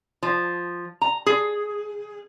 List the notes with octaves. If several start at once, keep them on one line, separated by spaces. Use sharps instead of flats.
F3
A#5
G#4